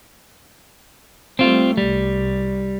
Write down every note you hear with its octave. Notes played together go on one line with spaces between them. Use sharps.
G3 A3 C4 F4
C2 G3